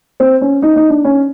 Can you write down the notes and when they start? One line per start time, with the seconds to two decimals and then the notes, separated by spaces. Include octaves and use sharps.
0.20 C4
0.41 C#4
0.62 D#4
0.76 D#4
0.90 D4
1.04 C#4